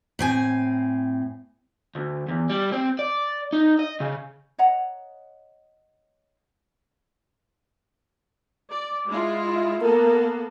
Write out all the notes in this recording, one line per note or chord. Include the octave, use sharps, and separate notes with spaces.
A2 C4 G#5
D2
E2
G3
C4
D5
D#4
D#5
C#3
C#5 D#5 F#5 A#5
D5
G#3 E4 F4
A#3 B3 A4 A#4